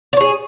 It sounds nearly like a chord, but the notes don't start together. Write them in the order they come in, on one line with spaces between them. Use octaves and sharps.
D5 C#5 G#4